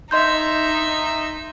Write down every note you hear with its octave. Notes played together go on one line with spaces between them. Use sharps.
D#4 D#5 E5 C6 G6